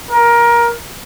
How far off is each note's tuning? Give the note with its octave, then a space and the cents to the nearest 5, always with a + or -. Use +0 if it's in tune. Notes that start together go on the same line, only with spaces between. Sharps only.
A#4 +20